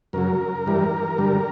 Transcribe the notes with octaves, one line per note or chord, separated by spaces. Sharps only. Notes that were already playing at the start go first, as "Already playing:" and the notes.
F#2 C#3 F#3 A#4
G2 E3 G3
G2 D3 G3